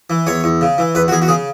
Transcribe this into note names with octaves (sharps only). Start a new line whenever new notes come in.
E3
E2 C#5
E2
C#3
E3
E2 B4
F#4
E2 G#4
F#4
C#3 G#4